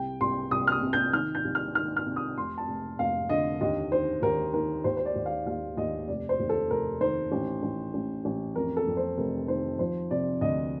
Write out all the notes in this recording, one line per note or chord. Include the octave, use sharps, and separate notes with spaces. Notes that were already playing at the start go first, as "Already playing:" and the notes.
Already playing: C2 G5
C2 C6
C2 D#6
F6
D#6
C3
G6
D#3 F6
G6
C2
F6
D#3 F6
F6
C3
D#6
F1 C6
A5
F1
F1 F5
D3 D#5
D#2 D#5
D#3 C5
D#2 A#4
D#3 A#4
D#2 C5
C5
D5
D#2
F5
D#2 F5
D#2 D#5
F1 D5
C5
D#2
A4
F1 A#4
D#3 C5
A1
A1
A1
A1
F2 A#4
A4
F2
C5
F1 A#4
D#3 C5
F3 C5
C3 D5
D2 D#5